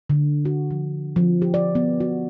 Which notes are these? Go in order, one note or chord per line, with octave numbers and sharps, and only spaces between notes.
D3
F#4
F3
F3
G4
D5
B3
F#4